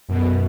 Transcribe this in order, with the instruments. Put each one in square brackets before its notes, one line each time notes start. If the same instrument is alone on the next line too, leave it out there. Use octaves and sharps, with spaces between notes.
[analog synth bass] F#2 [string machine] B2